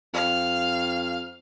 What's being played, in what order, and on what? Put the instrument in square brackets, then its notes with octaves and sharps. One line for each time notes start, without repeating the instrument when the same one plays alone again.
[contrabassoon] F2 [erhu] F5